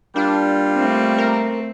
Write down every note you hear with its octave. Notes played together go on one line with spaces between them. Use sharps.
G3 A#3 D4 F4
A3 C4
A#4